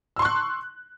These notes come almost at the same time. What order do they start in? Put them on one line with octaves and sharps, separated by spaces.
E6 C6 C#6 F#6